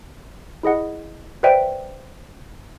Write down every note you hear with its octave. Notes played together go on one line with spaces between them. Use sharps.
E4 G#4 D#5 F#5
B4 C5 D5 E5 G5